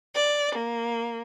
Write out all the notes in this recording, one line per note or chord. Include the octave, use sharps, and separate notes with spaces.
D5
A#3